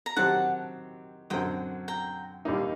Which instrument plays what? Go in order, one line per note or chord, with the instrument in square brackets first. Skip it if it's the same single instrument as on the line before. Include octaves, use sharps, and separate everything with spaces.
[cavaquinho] A#5
[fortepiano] D#3 F#3 C4 G4 [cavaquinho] F#5 A5
[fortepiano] F#2 D3 F#3 C4 [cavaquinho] D#5 G5
[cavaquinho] G5 A#5
[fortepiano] D#2 D#3 G3 A#3 D#4